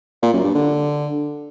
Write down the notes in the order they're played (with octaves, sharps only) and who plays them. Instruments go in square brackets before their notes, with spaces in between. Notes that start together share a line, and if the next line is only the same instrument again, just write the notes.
[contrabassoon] A#2
F#2
G2
D3